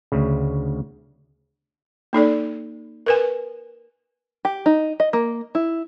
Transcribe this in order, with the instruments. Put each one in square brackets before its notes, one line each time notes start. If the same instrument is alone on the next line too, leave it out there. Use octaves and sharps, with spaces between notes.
[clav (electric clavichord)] D2 C#3
[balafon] A#3 D#4 A4 D5
A#4 B4 G#5
[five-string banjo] G4
D#4
D#5
A#3
E4